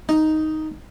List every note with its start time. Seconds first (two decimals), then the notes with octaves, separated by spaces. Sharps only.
0.09 D#4